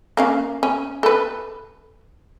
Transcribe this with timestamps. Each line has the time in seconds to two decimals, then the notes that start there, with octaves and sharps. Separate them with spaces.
0.17 A#3 C#4 F5
0.63 C#4
1.03 A4 B4